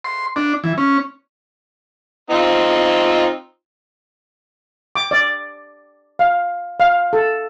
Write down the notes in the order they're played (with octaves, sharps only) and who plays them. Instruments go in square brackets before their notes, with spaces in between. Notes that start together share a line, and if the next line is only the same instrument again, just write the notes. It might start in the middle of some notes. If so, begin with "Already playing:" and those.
[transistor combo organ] C6
D4
E3
C#4
[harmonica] C4 D#4 F4
[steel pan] D6
D5
F5
F5
A4